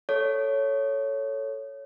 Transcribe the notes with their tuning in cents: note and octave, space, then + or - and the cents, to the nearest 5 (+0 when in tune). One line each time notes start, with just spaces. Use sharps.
A4 +0 C#5 +0